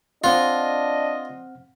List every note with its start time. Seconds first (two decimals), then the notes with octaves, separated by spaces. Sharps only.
0.24 C4 D4 F4 D#5 F#5 F6